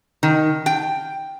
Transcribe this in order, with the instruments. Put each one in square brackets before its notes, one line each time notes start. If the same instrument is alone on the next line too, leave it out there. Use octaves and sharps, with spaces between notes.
[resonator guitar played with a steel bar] D#3
G5